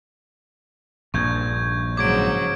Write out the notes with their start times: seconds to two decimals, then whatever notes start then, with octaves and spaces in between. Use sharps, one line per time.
1.14 A#1 G2 A#2 C#6 G6 G#6
1.97 G#2 C#3 F#3 D6 G#6 D7